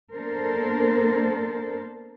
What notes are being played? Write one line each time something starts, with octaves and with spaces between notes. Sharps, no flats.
A#3 B3 D4 A4 A#4 C5